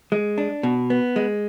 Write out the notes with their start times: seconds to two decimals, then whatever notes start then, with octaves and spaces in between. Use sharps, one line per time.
0.12 G#3
0.38 D4
0.63 B2
0.90 B3
1.16 G#3